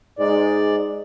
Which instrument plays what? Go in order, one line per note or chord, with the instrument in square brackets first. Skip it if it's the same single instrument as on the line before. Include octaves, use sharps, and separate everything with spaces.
[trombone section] G#2 G#3 [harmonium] D5